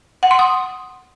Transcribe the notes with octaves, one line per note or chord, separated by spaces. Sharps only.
F#5
C6
D#6